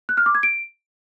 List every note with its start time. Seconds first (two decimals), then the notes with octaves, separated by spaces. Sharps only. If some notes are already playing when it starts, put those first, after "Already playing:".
0.09 F#6
0.17 F6
0.26 D6
0.35 G#6
0.43 D7